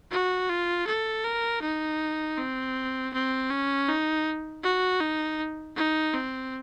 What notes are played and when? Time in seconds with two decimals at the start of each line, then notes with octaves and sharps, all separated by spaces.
0.12 F#4
0.49 F4
0.87 A4
1.25 A#4
1.62 D#4
2.38 C4
3.14 C4
3.51 C#4
3.89 D#4
4.64 F#4
5.01 D#4
5.76 D#4
6.14 C4